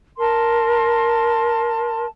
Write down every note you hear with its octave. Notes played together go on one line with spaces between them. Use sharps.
A#4 A5 C6